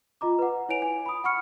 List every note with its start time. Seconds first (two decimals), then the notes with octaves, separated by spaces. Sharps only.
0.21 F4 D#5 A#5 D6
0.39 B4 F#5
0.69 E4 C#5 G#5 D7 F7
0.82 G#5
1.06 B5 D#6
1.24 F#5 B5 C#6 F6 C#7